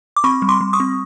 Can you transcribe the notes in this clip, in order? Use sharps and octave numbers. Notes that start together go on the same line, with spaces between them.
D6
C4 B5 C#6
G3
C6 D6
G3
C#6 D#6
C4